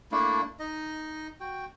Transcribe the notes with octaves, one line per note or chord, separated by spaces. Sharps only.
A3 A#3 D4 E4
D#4 D#5
F#4 G5